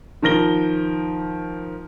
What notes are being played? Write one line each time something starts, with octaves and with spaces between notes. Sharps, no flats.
D#3 F3 A#4 A#6 G7